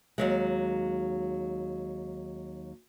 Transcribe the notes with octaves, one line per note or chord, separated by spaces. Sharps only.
D#2 F#3 G#3